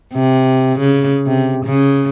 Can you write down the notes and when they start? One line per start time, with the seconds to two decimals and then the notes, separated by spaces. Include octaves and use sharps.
0.15 C3
0.79 C#3
1.27 C3
1.66 C#3